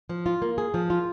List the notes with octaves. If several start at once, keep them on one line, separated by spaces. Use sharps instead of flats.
F3
F4
A#3
G#4
F3
F4